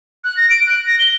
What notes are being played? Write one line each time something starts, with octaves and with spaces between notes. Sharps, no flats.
F#6
A#6
D7
F#6
A#6
G7